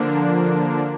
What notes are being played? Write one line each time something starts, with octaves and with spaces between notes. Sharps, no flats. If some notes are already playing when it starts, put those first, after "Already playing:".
Already playing: D3 F3 A#3 D4